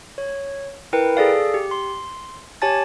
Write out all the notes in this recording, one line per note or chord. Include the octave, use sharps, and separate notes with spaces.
C#5
E4 A#4 B4 G5
G#4 A4 D5 F5
G4
C6
G4 C#5 G#5 A5 A6